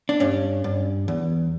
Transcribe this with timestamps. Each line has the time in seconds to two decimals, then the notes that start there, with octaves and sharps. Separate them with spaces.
0.09 D4
0.20 G2 C#4
0.64 G2
1.08 E2